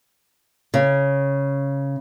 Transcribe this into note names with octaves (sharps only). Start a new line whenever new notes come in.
C#3